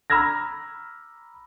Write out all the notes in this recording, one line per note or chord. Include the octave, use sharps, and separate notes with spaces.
A#5 B5 E6 F6 G#6 A#6